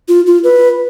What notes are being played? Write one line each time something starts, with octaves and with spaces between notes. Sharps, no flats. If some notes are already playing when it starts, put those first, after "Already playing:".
F4
F4
B4